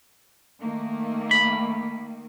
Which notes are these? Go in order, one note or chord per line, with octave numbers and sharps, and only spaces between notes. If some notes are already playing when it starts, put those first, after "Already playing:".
D#3 A3 A#3
B5